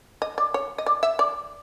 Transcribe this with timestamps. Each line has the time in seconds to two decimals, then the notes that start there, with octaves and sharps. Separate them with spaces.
0.22 D#5
0.38 D5
0.54 C#5
0.78 D#5
0.86 D5
1.03 E5
1.19 D5